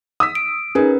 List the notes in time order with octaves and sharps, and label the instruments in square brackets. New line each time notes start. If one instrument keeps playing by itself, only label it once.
[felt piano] D#6 E6 B6
[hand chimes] D7
[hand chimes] C#4 A#4 B4 [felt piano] D#4 G#4